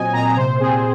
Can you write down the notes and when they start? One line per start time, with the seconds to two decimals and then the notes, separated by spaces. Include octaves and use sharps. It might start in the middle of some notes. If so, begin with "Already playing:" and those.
Already playing: A#2 F#3 C4 D#5 G#5
0.13 A#2 A#5
0.36 C3 C5
0.60 C4 G#4